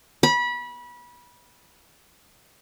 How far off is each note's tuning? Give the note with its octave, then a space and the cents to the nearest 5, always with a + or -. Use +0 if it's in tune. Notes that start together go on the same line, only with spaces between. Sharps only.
B5 -25